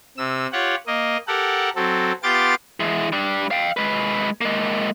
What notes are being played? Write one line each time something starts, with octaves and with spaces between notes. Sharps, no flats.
C3 E6
F4 G4 C#5 F#5
A#3 D#5
G4 A4 A#4 F#5
F#3 C4 A4
B3 F4 G4 C6 D6 A6
E3 G#3
G3 D4
F5 G5
G#3 B4
G#3 A#3